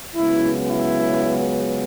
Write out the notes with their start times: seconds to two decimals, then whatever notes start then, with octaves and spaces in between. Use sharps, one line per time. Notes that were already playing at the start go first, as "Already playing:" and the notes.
0.15 C#2 C#3 F#3 B3 E4
0.67 E4